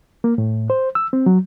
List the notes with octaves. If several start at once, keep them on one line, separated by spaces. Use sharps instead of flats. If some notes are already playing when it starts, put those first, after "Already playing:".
A#3
A2
C5
E6
C4
F#3